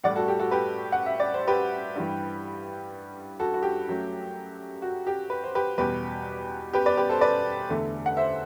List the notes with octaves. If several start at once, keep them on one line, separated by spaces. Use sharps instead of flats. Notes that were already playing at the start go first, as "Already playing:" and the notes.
A2 G3 D5 F#5
F#4 A4
G4
F#4 A4
G4 B4
F#5
E5
D5
C5
G4 B4
G2 E3 G3
F#4 A4
F#4
G4
F#2 F#3 A3
F#4
G4
B4
C5
G4 B4
E2 B2 G3 G4 B4
G4 B4
B4 D5
G4 B4
A4 C5
B4 D5
E2 D3 A3
F#5
C5 E5